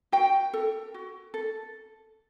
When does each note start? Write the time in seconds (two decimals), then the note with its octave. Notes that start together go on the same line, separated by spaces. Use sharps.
0.12 F#4 G5
0.54 A4
0.94 F#4
1.34 A4